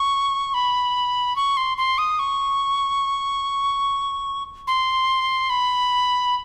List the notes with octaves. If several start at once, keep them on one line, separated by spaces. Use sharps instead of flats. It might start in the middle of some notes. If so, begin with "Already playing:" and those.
Already playing: C#6
B5
C#6
C6
C6
D#6
C#6
C6
B5